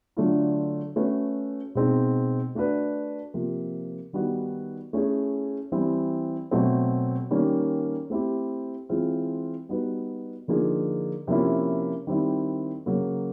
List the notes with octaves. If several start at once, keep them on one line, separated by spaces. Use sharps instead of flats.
D3 F#3 A3 D4 F4
A3 C#4 F#4 B4
B2 G#3 C4 D#4
A3 D4 F#4 B4
C3 F3 A#3
D#3 G3 B3 D#4 F#4
A3 C#4 E4 G#4
E3 G3 C4
B2 F#3 A3 C4
D#3 G3 A#3 C#4
A3 C4 E4 G4
E3 G#3 C4 F4
G3 B3 D#4 F#4 B4
D3 F3 A#3 D#4 G#4
C3 F3 A#3 C#4 E4
D#3 G3 C4 E4
C#3 F#3 A#3